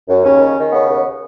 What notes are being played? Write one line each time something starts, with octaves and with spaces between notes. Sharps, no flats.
F#2
D#2 C#3 C#4
D#3
D#3
C#3 B3
D#2